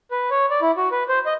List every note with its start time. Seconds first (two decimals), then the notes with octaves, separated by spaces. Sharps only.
0.11 B4
0.31 C#5
0.50 D5
0.62 E4
0.77 F#4
0.92 B4
1.09 C5
1.26 D#5